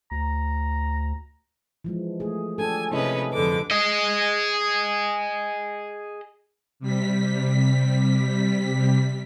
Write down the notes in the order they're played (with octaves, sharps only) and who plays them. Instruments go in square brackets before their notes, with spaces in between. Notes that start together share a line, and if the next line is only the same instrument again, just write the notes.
[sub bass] D2 [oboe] A#5
[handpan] E3 F3 G#3
A3 G#4
[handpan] D4 G4 A4 [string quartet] G#5
[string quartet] C3 C#4 B4 [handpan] E4 G#4 D#5
[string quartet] F2 D3 D6 [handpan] B4
[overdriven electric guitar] G#4 D#5
[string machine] C3 G3 B6